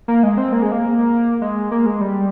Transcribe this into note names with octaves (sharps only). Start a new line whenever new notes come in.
A#3
G#3
C4
A#3
G#3
A#3
G#3
A#3
G#3
G3